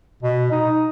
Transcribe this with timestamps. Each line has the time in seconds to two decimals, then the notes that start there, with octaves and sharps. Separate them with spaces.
0.23 B2
0.52 D#4